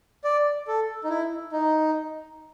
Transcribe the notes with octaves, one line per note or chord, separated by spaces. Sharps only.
D5
A4
D#4
E4
D#4